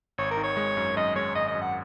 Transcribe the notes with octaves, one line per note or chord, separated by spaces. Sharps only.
G#1 C#5
A#4
D#3
C#5
G#3
F#2
F#2 D#5
G#3 C#5
G#1 D#5
D#5
F#2
F#5